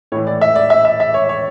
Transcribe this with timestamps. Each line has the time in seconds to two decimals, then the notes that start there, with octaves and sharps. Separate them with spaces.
0.12 A2 C#5
0.16 E3
0.27 D5
0.41 E5
0.55 D5
0.70 E5
0.85 E5
1.00 E5
1.14 C#5
1.29 C#5